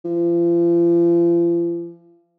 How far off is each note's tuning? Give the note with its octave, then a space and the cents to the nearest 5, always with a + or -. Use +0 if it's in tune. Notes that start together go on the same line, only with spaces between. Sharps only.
F3 -40